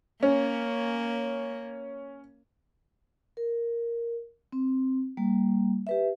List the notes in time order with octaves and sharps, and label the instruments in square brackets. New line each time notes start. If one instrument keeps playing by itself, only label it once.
[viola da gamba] A#3 [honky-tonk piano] C#4
[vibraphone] A#4
C4
G3 A#3
G4 B4 E5